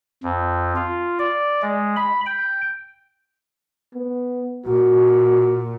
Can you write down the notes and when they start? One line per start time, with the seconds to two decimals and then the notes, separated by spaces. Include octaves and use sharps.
0.24 F2
0.76 F4
1.19 D5
1.62 G#3
1.97 B5
2.26 G5
3.95 B3
4.66 A#2 F#4